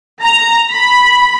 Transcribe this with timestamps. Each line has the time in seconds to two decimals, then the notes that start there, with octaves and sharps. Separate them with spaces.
0.22 A#5
0.72 B5